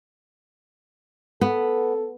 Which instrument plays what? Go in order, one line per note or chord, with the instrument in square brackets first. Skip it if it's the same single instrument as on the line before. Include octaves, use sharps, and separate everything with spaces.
[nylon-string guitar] B3 [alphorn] A4